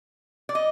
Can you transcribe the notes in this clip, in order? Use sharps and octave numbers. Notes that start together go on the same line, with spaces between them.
D5
D#5